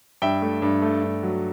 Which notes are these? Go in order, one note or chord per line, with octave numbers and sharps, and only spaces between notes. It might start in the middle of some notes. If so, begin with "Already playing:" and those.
G2 E5 G5
A3
G2
A3
G2
F#3